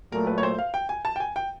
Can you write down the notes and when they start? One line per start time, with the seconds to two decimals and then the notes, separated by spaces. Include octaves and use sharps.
0.12 A#2 F#3 A3 A#4
0.27 B4
0.38 C#5
0.43 C5
0.59 F5
0.74 G5
0.89 G#5
1.05 A5
1.16 G5
1.20 G#5
1.36 G5